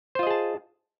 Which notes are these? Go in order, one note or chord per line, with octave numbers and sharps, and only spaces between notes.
F4 G#4 C5 D#5 A5